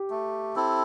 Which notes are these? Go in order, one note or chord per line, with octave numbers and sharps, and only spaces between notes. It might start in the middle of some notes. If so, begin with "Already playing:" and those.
Already playing: G4
A3
C4 E4 A4